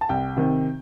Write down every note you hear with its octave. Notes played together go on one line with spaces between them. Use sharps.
A5
C2 G5
C3 D#3